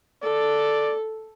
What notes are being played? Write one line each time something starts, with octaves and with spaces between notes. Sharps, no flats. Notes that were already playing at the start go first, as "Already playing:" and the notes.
A4 D5